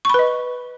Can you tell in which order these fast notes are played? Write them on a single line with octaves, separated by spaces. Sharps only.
C#6 B5 B4 D#5